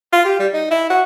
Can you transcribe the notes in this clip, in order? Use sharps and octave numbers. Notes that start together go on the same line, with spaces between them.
F4
G4
G3
D#4
E4
F#4